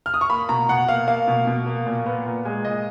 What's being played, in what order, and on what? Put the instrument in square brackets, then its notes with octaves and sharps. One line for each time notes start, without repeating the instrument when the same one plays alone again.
[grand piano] F6
D#6
C#6
A#3 B5
B2 A#5
B2 F#5
A#3 F5
A#3 F5
B2
B2
A#3
A#2
B3
A#2
G#3
A#2 D#5